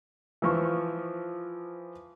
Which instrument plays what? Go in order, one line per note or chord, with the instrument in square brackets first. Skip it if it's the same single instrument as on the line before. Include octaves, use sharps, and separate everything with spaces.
[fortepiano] E3 F3 C#6